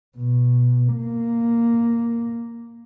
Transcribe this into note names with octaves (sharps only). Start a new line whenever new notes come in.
B2
A#3